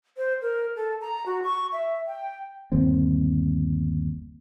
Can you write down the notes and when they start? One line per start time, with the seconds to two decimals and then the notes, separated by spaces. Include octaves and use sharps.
0.17 C5
0.42 A#4
0.76 A4
1.01 A#5
1.26 F#4
1.43 C#6
1.73 E5
2.07 G5
2.72 G1 D#2 C4